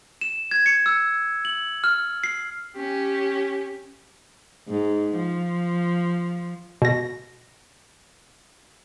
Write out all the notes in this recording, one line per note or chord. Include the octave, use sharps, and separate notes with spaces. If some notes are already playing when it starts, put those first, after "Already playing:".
E7
G#6
C#7
E6
F#7
F6
C7
C#4 G4
G#2
F3
B2 A#6